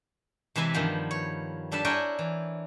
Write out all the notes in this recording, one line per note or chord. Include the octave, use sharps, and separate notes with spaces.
C3 E3 G#3 B4 G#5 B5
G2 D#3 F3 B3
C#5
G3 D4 A4 B4 A5
D4 E4 A#4 C#5 G5 G#5
E3